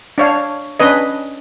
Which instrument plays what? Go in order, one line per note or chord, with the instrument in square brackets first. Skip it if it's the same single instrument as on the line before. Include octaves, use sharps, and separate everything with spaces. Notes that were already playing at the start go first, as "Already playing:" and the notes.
[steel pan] D4 C#5 F5
C#4 D4 B4 D#5